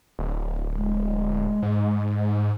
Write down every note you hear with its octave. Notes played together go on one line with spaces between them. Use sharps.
D1
G#3
G#2